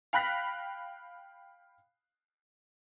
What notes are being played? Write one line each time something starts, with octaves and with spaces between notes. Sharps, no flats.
F5 G5 B5 F#6 A#6 B6